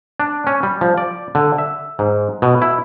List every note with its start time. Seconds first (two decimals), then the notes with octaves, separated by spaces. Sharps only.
0.20 D4
0.47 C#4
0.63 G3
0.81 F3
0.98 D5
1.35 D3
1.58 E5
1.99 G#2
2.42 B2
2.62 E4